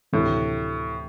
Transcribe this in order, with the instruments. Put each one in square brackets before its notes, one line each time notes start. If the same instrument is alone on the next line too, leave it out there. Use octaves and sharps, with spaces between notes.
[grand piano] D2 C3 E3 A3 [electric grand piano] A2